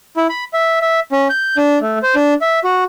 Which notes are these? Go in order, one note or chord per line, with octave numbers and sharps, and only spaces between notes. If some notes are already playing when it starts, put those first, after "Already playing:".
E4
B5
E5
E5
C#4
G6
D4
A3
C5
D4
E5
F#4